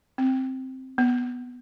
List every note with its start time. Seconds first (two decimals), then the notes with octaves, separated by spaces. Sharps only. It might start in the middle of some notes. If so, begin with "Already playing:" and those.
0.18 C4
0.98 B3